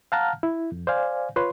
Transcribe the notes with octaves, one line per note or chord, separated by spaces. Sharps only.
F5 F#5 A5 A#5 F6
E4
F2
C5 D5 F5 G#5
F4 B4 C#5 C6